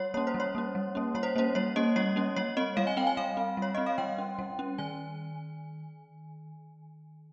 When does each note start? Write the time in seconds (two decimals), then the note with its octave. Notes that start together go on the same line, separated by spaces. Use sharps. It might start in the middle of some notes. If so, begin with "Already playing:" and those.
Already playing: G3 C#5
0.14 A#3 C#4 C#5
0.27 C5
0.34 G3
0.40 C#5
0.55 A#3 C#4
0.75 G3
0.95 A#3 C#4
1.15 G3 C#5
1.23 C5
1.36 A#3 C#4 C5
1.55 G3 C#5
1.76 A#3 C#4 D#5
1.96 G3 C#5
2.16 A#3 C#4
2.36 G3 C#5
2.57 C4 D#5
2.77 G3 F5
2.87 G#5
2.97 C4 G5
3.07 G#5
3.17 G3 F5
3.37 C4
3.57 G3 C#5
3.75 C4 D#5
3.86 F5
3.98 G3 G5
4.18 C#4
4.39 G3
4.59 C#4
4.78 D#3 G#5